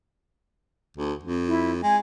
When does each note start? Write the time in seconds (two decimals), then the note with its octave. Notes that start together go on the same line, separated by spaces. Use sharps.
0.97 D2
1.24 F2
1.48 E4
1.83 G#3 G#5